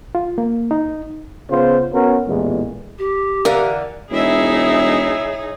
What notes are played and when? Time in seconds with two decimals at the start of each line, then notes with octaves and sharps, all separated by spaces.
0.15 F4
0.38 A#3
0.71 D#4
1.49 C#3 B3 F4 C5
1.93 B3 C#4 F#4 A#4
2.27 A1 E2 A#2 G#3
2.99 G4
3.45 D3 E3 A#4 F5
4.11 E1 D#4 E4 G#4 C#5 E5